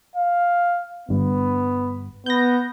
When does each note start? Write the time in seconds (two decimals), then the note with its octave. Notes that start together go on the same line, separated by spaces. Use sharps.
0.15 F5
1.09 G1 G2 B3
2.26 B3 G6 A#6